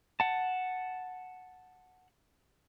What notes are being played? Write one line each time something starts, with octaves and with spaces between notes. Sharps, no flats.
F#5 A5